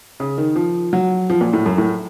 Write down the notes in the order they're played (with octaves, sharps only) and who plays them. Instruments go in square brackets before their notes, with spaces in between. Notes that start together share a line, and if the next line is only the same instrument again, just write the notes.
[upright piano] C#3
D#3
F3
F#3
F3
A#2
A2
F#2
A2